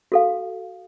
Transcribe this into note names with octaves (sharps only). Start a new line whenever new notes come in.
F#4 A4 F5